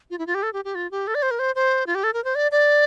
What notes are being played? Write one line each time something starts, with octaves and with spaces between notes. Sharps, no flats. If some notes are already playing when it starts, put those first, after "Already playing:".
F4
E4
F4
G4
A4
G4
G4
F4
G4
A4
D5
C5
A#4
C5
C5
F4
G4
A4
A#4
C5
D5
D5